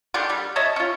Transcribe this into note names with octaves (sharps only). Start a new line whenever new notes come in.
D3 D#3 G#3 G4
G3
C#5 D#5 E5 A5
C#4 F4